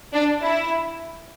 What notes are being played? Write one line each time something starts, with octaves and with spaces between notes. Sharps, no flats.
D4
E4